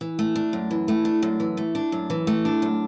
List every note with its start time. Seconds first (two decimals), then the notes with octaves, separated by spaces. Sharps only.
0.01 E3
0.19 A3
0.35 D4
0.53 F#2
0.71 E3
0.88 A3
1.05 D4
1.22 F#2
1.40 E3
1.57 A3
1.75 D4
1.92 F#2
2.10 E3
2.27 A3
2.45 D4
2.62 F#2